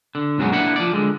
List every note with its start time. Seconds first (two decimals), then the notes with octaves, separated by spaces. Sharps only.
0.15 D3
0.38 B1 F#2 F#3 G#3 F#4
0.52 A#3 D4 E4 F#5
0.76 F3 D5
0.93 D3 G#3